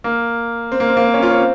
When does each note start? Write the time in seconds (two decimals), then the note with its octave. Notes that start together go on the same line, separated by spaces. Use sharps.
0.04 A#3
0.72 C4
0.80 A#3
0.89 C4
0.97 A#3
1.06 C4
1.14 C#4
1.23 F4
1.31 C#4
1.39 C4